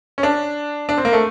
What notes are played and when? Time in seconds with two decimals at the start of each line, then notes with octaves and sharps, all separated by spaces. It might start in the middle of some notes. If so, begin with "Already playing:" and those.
0.18 C#4
0.23 D4
0.89 D4
0.98 C4
1.05 A#3
1.13 A3